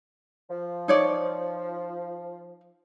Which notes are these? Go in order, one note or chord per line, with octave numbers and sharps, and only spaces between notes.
F3
D#4 C#5 D5